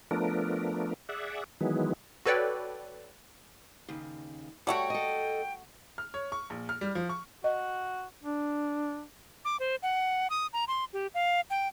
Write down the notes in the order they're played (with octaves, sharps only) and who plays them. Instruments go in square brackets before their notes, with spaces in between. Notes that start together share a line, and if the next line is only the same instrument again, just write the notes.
[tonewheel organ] F3 A3 B3 D4 A#4
G#4 D5 E5 F#5
D#3 E3 F#3 G#3 B3
[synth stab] F#4 A4 B4 C#5 D5 G5
[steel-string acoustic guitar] D#2 C#3
[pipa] G3 A3 F#4 [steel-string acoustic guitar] C#5 F#5 [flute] G5
[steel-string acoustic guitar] A4 D#5
[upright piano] F6
C#5
C#6
A#1
F6
G3
F3
C#6
[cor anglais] F#4 [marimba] D#5
[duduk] D4
[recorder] D6
C5
F#5
D#6
A#5
C6
G4
F5
G5